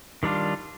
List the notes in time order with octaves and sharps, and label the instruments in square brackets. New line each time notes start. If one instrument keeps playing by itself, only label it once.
[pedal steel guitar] D#3 G3 D4 F4